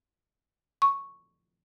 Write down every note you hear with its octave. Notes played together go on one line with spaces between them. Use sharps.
C#6